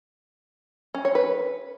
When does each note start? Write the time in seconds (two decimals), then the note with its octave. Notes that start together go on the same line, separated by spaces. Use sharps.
0.95 C#4
1.05 C#5
1.15 B4